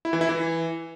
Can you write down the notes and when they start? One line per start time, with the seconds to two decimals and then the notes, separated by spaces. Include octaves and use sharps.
0.05 E4
0.13 E3
0.21 E4
0.29 E3